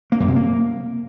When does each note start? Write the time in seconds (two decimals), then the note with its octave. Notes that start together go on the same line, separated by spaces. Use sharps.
0.12 A#3
0.20 F#2
0.28 C3
0.36 A#3